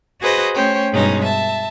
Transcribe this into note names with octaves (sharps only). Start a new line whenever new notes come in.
F#4 G#4 B4 C5 D#5
A3 C#4 C5 C#5 G5
G2 B2 G#3 C#4 D#4
E5 A5